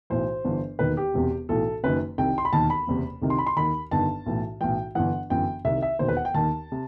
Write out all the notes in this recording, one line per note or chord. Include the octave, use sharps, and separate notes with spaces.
B1 A2 E3 C5
G1 G2 E3
E1 D#2 D#3 B4
G4
E1 E2 C3
B1 A2 E3 A4
F#1 F#2 D#3 B4
C2 C3 D#3 G5
C6
B5
E1 D#2 D#3 A5
B5
F#1 E2 C3
C2 C3 D#3
C6
B5
C6
D#2 D#3 B5
G1 G2 D#3 A5
B1 A2 E3
B1 A2 E3 G5
G1 G2 E3 F#5
G1 F#2 E3 G5
C2 C3 D#3 E5
E5
E1 D#2 D#3 C5
B4
F#5
G5
D#2 D#3 A5
C3